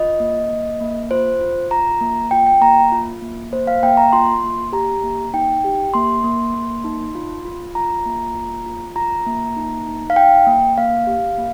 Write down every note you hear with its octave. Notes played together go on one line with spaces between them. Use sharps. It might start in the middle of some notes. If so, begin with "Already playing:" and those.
Already playing: F4 D#5
A#3
A#3
A#3
F4 C5
F4
F4 A#5
A#3
F4 G5
G5
A#3 A#5
F4
A#3
A#3 C5
F5
A#3 G5
A#5
F4 C6
A#3
G4 A#5
A#3
D#4 G5
G4
A#3 C6
A#3
A#3
D#4
F4
F4
F4 A#5
A#3
F4
F4
F4 A#5
A#3
D#4
D#4
F5
D#4 G5
A#3
A#3 F5
G4
A#3